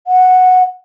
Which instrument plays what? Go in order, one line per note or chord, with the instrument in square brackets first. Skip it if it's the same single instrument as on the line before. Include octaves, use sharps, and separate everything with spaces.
[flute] F#5